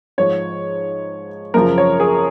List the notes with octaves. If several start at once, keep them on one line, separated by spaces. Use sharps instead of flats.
G#2 F3 C#5
F#2 C#3 F3 A#4
C#5
G#4